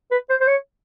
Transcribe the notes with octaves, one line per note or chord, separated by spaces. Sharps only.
B4
C5
C5
C#5